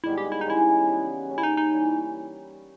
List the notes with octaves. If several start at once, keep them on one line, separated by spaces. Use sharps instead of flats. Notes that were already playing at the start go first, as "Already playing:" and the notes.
G#2 D#3 G3 B3 E4
G4
E4
D#4
C#3 E3 G#3 E4
C#3 G3 B3 G4
B2 A#3 C#4
E4
D#4
D#4
E3 G3 C#4 E4